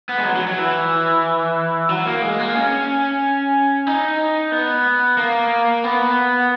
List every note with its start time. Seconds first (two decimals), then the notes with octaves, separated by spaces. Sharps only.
0.09 B3
0.18 G#3
0.25 F#3
0.36 F#3
0.47 F#3
0.58 E3
1.89 F#3
2.06 A#3
2.22 G#3
2.39 A#3
2.55 C#4
3.87 D#4
4.52 B3
5.17 A#3
5.84 B3